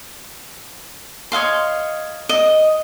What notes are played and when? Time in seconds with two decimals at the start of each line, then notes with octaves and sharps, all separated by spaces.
1.32 C#5 D#5 F5 C6
2.29 D#5